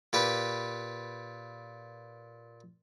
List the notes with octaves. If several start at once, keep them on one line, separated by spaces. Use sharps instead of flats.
A#2 G4 B4